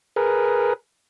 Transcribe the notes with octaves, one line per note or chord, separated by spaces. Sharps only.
G#4 A#4 B4